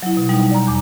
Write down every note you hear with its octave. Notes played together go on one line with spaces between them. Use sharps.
F#3 E4
B2
G3 D#4
D5 A#5
E2 D6